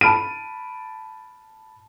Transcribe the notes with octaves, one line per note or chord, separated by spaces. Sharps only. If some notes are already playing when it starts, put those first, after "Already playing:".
A5 B5 F6 D7 D#7